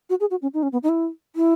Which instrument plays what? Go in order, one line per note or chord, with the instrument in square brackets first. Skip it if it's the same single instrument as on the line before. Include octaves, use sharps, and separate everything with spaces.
[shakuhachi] F#4
G#4
F#4
C#4
D#4
C#4
B3
D#4
E4
E4